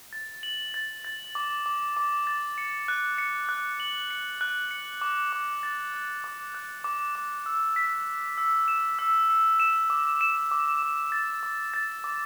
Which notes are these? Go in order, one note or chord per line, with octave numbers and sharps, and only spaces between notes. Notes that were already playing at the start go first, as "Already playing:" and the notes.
A6
F#7
A6
A6
D6
D6
D6
A6
C#7
F#6
C#7
F#6
F#7
C#7
F#6
C#7
D6
D6
A6
F#6
D6
F#6
D6
D6
E6
B6
E6
E6
E7
E6
E6
E7
D6
E7
D6
D6
A6
D6
A6
D6